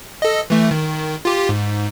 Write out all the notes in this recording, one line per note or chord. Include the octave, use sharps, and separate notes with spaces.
A4 D#5
E3 A3
D#3
F4 G4
G#2